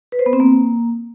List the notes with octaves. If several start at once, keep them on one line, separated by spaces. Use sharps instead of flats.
B4
C5
B3
C4
A#3